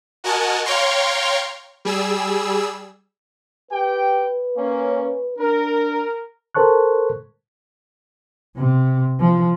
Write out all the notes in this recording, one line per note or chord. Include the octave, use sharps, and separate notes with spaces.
F#4 A#4 D#5 F#5 G#5 A5
C#5 F5 G5 A#5 C6 C#6
G3 G#4 E6
G4 B4 G5
A#3 C#4
D4 A#4
A4 A#4 C5 A5 C#6 F#6
C3
F3